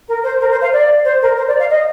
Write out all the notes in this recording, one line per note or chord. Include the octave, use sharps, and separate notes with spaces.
A#4
C5
A#4
C5
F5
D5
C5
A#4
C5
D5
F5
D#5